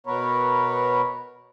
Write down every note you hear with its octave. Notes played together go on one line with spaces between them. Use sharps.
B2 B3 A#4 B4 C#5